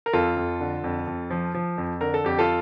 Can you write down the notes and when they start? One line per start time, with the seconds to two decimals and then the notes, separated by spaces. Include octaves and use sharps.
0.06 A#4
0.13 F2 F4 A4
0.36 F2
0.60 D3
0.84 F2
1.07 F2
1.30 F3
1.55 F3
1.78 F2
2.01 D3 A#4
2.14 A4
2.24 F2 G4
2.39 F4 A4